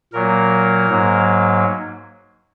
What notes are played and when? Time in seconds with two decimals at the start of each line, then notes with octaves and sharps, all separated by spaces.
0.13 A#2 F#3 A#3 A#4
0.89 G#2 F#3 A#3